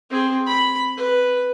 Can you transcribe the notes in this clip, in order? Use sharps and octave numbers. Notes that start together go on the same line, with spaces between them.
C4 G#4
B5
B4